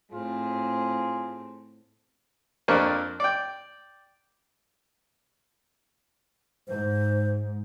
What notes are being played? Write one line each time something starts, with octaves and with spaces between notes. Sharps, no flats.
A2 C4 F4 G#4
F2 A#3 C4 D4 C#6
D5 G5
G#2 C5